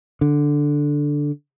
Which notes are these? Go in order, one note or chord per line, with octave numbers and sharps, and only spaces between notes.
D3